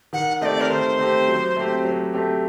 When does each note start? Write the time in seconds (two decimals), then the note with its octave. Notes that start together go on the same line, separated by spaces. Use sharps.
0.13 D#3 F#5
0.41 A3 C4 G4 D5 D#5
0.61 A#4
0.70 D#3 C5
0.99 A3 C4 G4
1.28 F#3
1.56 A3 C4 G4
1.85 F#3
2.14 A3 C4 G4